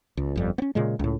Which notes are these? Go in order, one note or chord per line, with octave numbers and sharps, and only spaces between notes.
C#2
G1 F2 G3
B3 C#4
A#2 C#3 G#3
C#2 A2